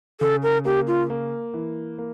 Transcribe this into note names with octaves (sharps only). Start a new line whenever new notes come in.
C#3 A4
A#4
A#3 G4
F4
A#3
E3
A#3